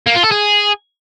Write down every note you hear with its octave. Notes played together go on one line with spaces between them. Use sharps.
A#3
F4
A4
G#4